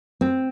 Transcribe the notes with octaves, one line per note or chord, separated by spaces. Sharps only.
C4